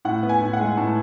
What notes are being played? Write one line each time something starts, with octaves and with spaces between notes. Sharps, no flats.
A2 F#5
B3
G#5
A2
F#5
G#3
A2 A5